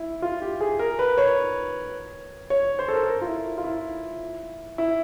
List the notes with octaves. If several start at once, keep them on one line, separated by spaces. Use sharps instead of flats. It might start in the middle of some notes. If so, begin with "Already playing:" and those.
Already playing: E4
F4
G4
G#4
A#4
B4
C#5
C#5
C5
A4
A#4
A4
A#4
F4
E4
F4
E4
E4